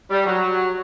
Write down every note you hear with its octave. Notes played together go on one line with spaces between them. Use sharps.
G3
F#3